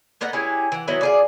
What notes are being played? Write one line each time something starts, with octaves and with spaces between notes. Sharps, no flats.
A#3 B3 D#5 F#5
C#4 E4 G4 G#4
E3 F#5
D#3 F#3 B3 E4
F4 G#4 D5